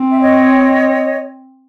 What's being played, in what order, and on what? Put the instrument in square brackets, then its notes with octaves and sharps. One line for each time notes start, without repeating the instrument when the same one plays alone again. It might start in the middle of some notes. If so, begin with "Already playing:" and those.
Already playing: [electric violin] C4
[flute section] E5
C#5 D#5